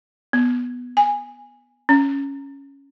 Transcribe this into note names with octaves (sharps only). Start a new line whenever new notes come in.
B3
G#5
C#4